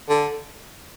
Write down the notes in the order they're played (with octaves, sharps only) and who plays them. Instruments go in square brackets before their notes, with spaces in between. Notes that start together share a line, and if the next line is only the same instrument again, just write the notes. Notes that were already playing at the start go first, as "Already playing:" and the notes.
[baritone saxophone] D3